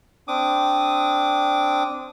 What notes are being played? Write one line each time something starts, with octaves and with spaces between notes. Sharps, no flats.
C4 D4 D6 D#6